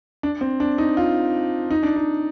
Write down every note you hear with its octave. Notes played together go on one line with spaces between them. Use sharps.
D4
C4
D4
D#4
F4
D#4
D4
D#4